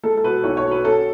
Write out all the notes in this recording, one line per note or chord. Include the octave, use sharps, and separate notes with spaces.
G#3 A4
A4
B2 B4
B1 C#5
C#5
B2
B4
C#4 A4